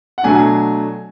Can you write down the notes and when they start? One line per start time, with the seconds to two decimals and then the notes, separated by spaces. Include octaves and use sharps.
0.18 F#5
0.24 B2 F#3 A3 D4 G#5